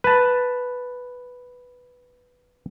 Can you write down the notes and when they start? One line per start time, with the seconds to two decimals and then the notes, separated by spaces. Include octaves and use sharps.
0.04 B4 A5